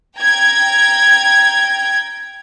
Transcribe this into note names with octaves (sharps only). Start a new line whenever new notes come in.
G5 A#5 G#6